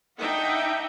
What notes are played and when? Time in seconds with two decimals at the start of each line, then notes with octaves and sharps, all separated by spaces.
0.18 D4 D#4 E5 F#5 G5